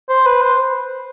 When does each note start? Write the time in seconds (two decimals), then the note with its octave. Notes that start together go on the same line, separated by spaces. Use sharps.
0.09 C5
0.26 B4
0.41 C5